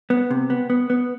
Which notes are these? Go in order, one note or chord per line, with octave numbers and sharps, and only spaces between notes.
B3
C3
B3
B3
B3